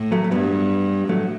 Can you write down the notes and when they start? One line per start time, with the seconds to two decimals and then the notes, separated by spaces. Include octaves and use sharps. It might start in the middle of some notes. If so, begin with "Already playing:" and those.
Already playing: A2
0.12 F#3 A3
0.24 A3
0.31 G2 G3 B3
1.08 A2 F#3 A3